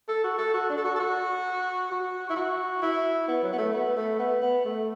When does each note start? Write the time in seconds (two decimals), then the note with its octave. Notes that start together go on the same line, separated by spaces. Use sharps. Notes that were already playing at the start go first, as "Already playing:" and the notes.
0.08 A4
0.24 F#4
0.38 A4
0.54 F#4
0.69 D4
0.78 A4
0.84 F#4
0.95 A4
0.99 F#4
1.91 F#4
2.29 E4
2.36 F#4
2.82 E4
3.28 B3
3.43 F#3
3.53 B3
3.58 A3
3.74 B3
3.96 A3
4.19 B3
4.42 B3
4.65 A3